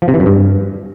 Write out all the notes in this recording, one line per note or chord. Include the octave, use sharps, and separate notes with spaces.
F3
C3
E3
F#2
G2